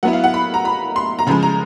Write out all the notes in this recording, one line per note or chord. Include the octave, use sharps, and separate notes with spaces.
F#3 B3 E4 F#5
F5
F#5
B5
A#5
B5
C6
A#5
C#3 F3 G#3 B5
A#5